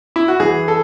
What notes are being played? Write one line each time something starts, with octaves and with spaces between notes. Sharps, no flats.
E4
F#4
E3 G#4
A4